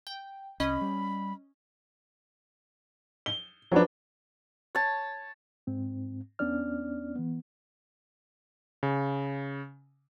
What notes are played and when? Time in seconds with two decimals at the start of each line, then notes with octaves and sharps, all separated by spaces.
0.07 G5
0.60 C2 C#4 D#5 B5
0.81 G3
3.26 G7
3.71 F3 F#3 D4 F#4 B4
4.75 C#5 A5
5.67 G#2 C4
6.39 E2 B3 C#4 D4 D5 F6
7.16 E3 B3
8.83 C#3